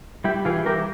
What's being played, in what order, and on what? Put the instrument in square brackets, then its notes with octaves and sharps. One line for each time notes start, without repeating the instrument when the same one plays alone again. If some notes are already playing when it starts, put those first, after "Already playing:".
[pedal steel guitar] G3 E4 G4
E3 F4 G#4
E3 G4 A#4